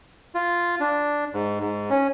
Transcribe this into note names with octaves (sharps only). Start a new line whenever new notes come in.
F4
D4
G#2
G#2
C#4